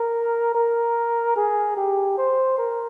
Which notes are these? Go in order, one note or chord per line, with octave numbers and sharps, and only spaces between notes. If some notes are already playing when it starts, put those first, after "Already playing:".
Already playing: A#4
A#4
G#4
G4
C5
A#4